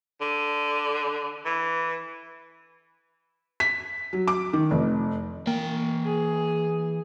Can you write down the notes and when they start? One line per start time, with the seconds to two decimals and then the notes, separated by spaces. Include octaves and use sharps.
0.21 D3
1.45 E3
3.60 B6
4.13 F#3
4.28 D6
4.53 D#3
4.71 F1
5.47 E3 A#3 G5
6.05 G#4